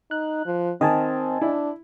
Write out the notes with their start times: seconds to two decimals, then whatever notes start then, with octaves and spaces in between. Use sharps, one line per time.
0.11 D#4 F#6
0.46 F3
0.81 D#3 C4 D#5 G#5 A5
1.41 D4 E4